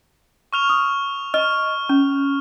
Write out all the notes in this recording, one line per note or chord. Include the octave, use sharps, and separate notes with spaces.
C#6 F6 F7
D#6
D#5 C#6 F6
C#4